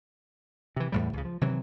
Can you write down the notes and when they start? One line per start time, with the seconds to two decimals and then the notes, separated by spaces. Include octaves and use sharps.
0.76 C3 E3
0.92 E2 A2 G3
1.13 C#2 C#3
1.25 F3
1.41 C3 D#3 E3 F#3